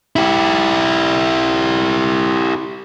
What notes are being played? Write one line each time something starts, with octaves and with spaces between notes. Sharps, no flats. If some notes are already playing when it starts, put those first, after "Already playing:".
E4 G4